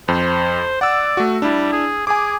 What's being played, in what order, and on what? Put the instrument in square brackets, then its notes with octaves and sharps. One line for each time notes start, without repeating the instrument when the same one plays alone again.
[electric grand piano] F2 [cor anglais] C5
[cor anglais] D5 [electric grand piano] F#5 E6
[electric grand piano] A3 F#4
[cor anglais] G3 [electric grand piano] D4 E4
[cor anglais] G#4
[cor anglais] G#4 [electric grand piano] G#5 D6